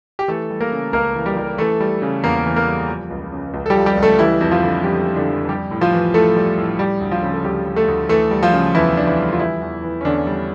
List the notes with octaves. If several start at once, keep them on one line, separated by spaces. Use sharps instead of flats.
G4
E3 A3 A4
G3
A#3 A#4
C#3
C#2 A#3 A#4
E3
G3 G4
G3
E3 A3 A4
G3
C#3
E2 A#3 A#4
E3
A#3 A#4
G3
F3
C#2
C#3
C#2
A4
G3 G4
F3
G3 G4
C#2
A3 A4
E3 G3 E4
F2
F3 F4
D3
F2 G3 G4
G3
D3 D4
F2
G3 G4
A2
F3 F4
E3
A2 A3 A4
G3
A2
G3 G4
D2
F3 F4
C#3
A4
D2 G3 G4
G3
A3 A4
D2
E3 A3 A4
G3
F3 F4
C#3
E2 E3 E4
E3 D4
E3 E4
G3
F4
E3 G3 E4
E2
E3
C#4
E2 D3 D4
G3